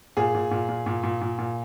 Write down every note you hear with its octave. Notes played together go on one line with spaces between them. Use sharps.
A#2 G#4
A#2
A#2
A#2
A#2
A#2
A#2
A#2